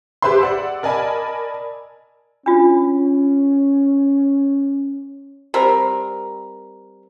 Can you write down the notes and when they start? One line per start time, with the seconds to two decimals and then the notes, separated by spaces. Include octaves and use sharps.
0.22 G4 G#4 B4 C5 E5 C6
0.41 D5 F#5 E6
0.83 A#4 D5 D#5 G#5 A5 B5
2.46 C#4 D4 F4
5.54 G3 C4 A#4